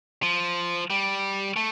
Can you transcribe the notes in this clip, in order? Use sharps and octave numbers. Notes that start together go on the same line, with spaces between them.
F3
G3
A3